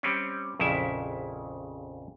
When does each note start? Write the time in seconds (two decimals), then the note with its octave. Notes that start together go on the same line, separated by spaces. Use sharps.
0.03 G3 C4 C#4
0.60 A#1 F2 C#3 E4 E5